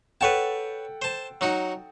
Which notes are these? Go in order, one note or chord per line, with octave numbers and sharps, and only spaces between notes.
A4 B4 C#5 F#5 G5 A5
C5 A5
F#3 D#4 F#4